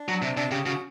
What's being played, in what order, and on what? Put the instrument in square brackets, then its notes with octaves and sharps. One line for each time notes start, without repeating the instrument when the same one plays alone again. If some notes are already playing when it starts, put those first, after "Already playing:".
Already playing: [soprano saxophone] D4
[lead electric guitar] F#3
C3
[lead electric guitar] C3 [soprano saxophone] D4
[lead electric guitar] C#3 [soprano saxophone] G4
[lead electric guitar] C#3 [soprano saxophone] F#4